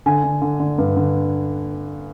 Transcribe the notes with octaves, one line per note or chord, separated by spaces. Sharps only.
D3 G#5
D3
D3
D3
G2
D3